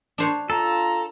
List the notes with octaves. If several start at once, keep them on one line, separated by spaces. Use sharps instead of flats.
D4 C5 C#5
F4 A4 A#5